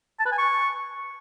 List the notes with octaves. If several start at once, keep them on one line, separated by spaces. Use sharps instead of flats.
A5
B4
G#5
C#6